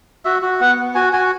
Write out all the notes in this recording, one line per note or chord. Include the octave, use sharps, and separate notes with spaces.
F#4 E5
F#4
B3 F#5
B3
F#4 G#5
F#4 G#5